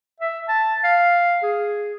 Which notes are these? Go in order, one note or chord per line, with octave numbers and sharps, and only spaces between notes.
E5
A5
F5
G#4